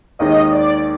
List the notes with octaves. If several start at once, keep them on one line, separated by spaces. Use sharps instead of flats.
D#2 D#3 G#3 D#5
D5